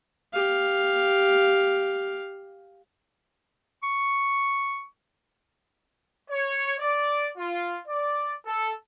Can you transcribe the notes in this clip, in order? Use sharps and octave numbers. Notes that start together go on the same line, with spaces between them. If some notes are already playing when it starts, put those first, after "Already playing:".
G4 F5
C#6
C#5
D5
F4
D5
A4